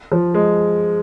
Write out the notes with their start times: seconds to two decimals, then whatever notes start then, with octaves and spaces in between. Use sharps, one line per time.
0.12 F3
0.34 G#3